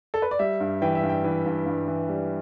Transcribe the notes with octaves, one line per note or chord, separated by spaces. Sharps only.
A4
B4
D5
G3 E5
G2
E3 G5
E5
G2
G5
E3
G2
G2
E3
G3